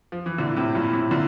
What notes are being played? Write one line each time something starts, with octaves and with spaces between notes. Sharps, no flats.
F3
E3
A#2 D3 E4
A2 C3
G2 A#2
A2 C3
A#2 D3